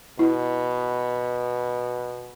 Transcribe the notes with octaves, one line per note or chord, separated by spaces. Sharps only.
B2 E4